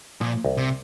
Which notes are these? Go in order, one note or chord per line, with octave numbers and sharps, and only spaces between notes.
A#2 F3
C2
C3